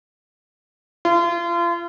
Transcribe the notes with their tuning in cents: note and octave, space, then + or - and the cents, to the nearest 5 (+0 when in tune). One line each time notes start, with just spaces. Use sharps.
F4 -35